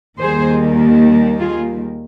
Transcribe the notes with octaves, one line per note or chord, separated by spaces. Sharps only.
D#2 D#3 G3 A#3 G#4 C5
F4 G#4